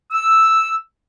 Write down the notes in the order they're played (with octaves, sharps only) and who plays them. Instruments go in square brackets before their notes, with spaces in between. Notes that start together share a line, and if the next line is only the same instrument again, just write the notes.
[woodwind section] E6